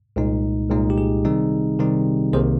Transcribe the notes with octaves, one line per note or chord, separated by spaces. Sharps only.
C2 A#2 G#3 D#4
C2 A#2 G#3 D#4
G4
G#4
C3 D#3 G3 C4 D#4
C3 D#3 G3 C4 D#4
C2 C3 D#3 A#3 G#4 C5